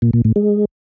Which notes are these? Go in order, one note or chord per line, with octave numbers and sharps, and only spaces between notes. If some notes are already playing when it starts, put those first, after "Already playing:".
A#2
A#2
A2
G#3